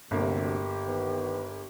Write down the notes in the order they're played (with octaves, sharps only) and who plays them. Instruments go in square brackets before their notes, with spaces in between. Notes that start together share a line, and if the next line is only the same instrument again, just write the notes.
[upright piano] G1 A#3 [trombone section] D2 C3 [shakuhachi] G4
[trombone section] D#3 B3 B4